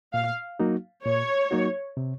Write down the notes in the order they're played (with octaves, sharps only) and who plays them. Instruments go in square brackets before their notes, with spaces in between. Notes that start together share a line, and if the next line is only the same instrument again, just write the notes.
[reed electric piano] A#2 [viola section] F5
[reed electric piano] F#3 A#3 D#4 F#4
[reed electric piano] A#2 [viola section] C#5
[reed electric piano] F#3 A#3 D#4 F#4
C3